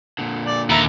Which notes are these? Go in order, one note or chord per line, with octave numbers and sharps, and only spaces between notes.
A#2 D3
D5
D#2 E5 A#5 B5